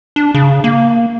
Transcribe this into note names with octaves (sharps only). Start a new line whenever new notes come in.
D4
C#3
A#3